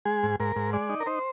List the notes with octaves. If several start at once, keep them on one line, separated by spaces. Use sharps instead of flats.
G#3 G#4
G#2
G#2 A#4
G#2
G#3 D5
D#4
A#4
D#4 C5